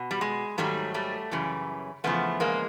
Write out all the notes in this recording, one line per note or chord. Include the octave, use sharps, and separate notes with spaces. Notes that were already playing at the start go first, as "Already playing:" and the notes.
Already playing: B2
G3
G#3
G#2 D#3 F#3 G3 A3
G3 A3
F#2 C#3 E3 G3
E2 C#3 F3 A3 B3
G#3 A#3